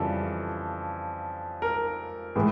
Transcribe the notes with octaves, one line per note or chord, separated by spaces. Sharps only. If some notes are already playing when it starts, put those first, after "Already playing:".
Already playing: F2 C#3 E3 G3 A4
A#4
A2 E3 G#3